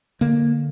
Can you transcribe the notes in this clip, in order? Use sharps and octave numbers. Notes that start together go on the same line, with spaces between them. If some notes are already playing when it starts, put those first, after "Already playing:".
D3 A#3